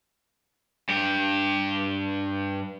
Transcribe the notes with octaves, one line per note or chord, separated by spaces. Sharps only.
G2 G4